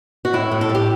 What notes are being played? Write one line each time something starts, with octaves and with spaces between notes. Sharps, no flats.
F#4
A2 E4
A2
A4
G3
G4